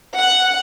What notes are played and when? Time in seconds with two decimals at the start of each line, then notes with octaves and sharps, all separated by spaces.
0.18 F#5